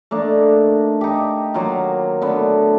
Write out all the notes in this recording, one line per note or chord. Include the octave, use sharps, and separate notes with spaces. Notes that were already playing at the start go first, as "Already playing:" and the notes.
A3 A#3 D4 D#4
D#4 G4
D#3 F#3 A#3 F4
D3 A3 B3